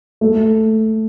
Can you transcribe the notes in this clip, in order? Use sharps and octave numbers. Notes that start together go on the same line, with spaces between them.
A3